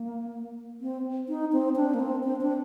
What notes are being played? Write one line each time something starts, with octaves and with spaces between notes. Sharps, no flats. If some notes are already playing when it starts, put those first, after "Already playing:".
Already playing: A#3
C4
D#4
C4
D4
A#3
C4
C4
D4